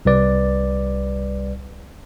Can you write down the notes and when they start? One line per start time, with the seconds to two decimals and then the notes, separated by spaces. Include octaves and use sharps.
0.05 C2 G3 B4 D5